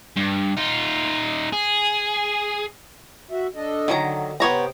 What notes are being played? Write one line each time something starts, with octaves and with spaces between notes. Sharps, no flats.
G2
D#4 F4
G#4
F#4 E5
D4 A4 D#5
D3 D#3 F#3 A#5
C3 B3 C5 C#5 G5 A#5